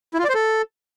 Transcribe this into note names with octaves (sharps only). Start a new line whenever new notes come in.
E4
F4
D5
C5
A4